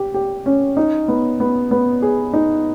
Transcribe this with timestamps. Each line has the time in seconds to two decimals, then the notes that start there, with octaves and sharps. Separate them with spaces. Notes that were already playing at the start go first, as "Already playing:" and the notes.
Already playing: G4
0.14 G4
0.46 C#4
0.77 D#4
1.08 B3
1.40 B3
1.71 B3
2.02 G#4
2.33 D#4